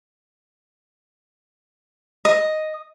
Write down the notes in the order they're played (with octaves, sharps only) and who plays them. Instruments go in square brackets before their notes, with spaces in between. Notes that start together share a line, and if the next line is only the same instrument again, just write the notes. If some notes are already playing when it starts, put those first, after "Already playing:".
[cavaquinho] D#5